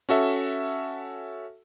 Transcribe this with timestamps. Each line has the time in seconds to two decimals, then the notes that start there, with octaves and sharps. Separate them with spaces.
0.09 C#4 F#4 A4 E5